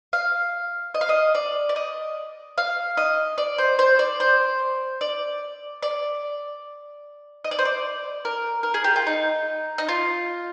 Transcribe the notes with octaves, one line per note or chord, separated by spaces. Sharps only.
F5
D#5
F5
D#5
D5
D5
D#5
F5
D#5
D5
C5
C5
D5
C5
D5
D5
D#5
D5
C5
D5
A#4
A#4
G#4
G4
F4
D#4
D#4
F4